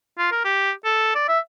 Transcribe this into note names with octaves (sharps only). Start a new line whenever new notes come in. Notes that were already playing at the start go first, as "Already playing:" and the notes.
F4
A#4
G4
A4
D5
E5